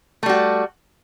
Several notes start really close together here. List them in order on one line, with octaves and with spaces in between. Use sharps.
A3 G3 F#4